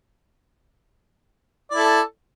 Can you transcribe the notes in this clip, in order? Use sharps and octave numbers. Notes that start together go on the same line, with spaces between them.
E4 A4 D5